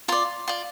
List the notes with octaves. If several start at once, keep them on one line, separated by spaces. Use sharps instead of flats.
F4 D5 C6
F4 D5